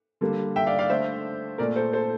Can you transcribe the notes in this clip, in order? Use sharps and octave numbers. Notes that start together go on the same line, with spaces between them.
D3 G3 A#3
E5 G5
D5 F5
D5 F5
D3 A3 C5 E5
A#2 A3 A#4 D5
A4 C5
A4 C5